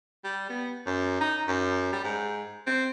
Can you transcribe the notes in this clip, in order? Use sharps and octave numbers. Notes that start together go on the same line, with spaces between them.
G3
B3
F#2
D#4
F#2
G3
G#2
C4